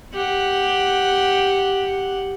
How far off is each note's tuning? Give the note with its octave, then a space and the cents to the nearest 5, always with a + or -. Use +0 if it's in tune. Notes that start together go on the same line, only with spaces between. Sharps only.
G4 +0 F#5 +0